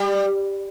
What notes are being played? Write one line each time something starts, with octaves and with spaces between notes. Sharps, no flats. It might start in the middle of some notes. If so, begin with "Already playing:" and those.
Already playing: G3